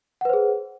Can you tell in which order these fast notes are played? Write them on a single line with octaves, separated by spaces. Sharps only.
F#5 B4 C5 G#4